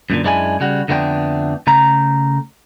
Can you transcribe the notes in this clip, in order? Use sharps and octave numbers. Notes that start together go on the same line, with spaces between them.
F#2 A#2 D3
F#2 E3 G#3 D4 E4 G#5
C#3 G3 F#4
F2 D3 A3 B3 D4 G5
C#3 A3 A#5